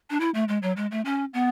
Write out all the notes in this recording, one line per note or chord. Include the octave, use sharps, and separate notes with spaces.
D4
E4
A3
G#3
F#3
G#3
A3
C#4
B3